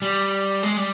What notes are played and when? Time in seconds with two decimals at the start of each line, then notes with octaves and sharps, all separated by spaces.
0.02 G3
0.63 G#3
0.77 G3